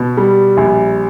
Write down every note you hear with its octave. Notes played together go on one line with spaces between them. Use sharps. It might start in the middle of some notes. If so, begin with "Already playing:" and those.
Already playing: B2
G3
A#1